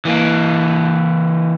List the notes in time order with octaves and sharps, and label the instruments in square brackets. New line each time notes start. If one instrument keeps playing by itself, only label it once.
[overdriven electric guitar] E3 A#3